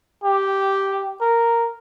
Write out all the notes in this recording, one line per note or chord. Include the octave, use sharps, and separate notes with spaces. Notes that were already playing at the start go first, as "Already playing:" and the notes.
G4
A#4